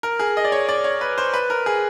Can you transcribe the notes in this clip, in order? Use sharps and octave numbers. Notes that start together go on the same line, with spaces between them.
A#4
G#4
D#5
D5
C#5
D5
C#5
B4
C5
B4
A#4
G#4